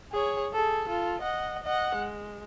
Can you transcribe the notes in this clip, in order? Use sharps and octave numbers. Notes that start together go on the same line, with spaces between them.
G#4 C#5
G#4 A4
F4 A4
D#5 F#5
D#5 F#5
G#3